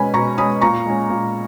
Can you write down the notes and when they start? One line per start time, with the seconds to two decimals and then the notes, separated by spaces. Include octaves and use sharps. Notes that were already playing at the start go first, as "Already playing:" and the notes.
Already playing: B2 G#3 C#4 G#5 B5
0.14 B2 A#5 C#6
0.38 G#3 C#4 B5 D#6
0.61 A#2 A#5 C#6
0.86 G#3 C#4
1.10 A#2